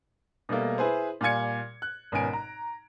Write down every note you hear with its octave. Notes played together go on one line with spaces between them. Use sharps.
B2 G3 A3 A#3
E4 G#4 B4 C5
A#2 G3 F5 G#5 G#6 C#7
F#6
G#1 B2 C#4 A#4 G#5 D7
A#5